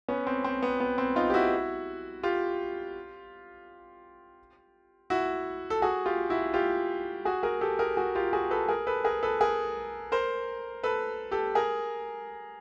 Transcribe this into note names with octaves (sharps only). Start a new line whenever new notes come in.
B3 C#4
C4
C4
B3
B3
C4
D#4 F4
G4
E4 F#4
F4 G4
E4 F#4
A4
F#4 G#4
F4 G4
E4 F#4
F4 G4
F#4 G#4
G#4 A#4
G4 A4
G#4 A#4
F#4 G#4
F4 G4
F#4 G#4
A4 B4
G#4 A#4
A4 B4
G#4 A#4
A4 B4
G#4 A#4
A#4 C5
A4 B4
G4 A4
G#4 A#4